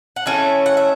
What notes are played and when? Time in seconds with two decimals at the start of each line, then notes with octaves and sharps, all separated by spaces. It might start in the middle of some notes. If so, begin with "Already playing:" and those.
0.16 F#5
0.26 E3 A3 C#4 E5
0.66 F#5
0.77 E5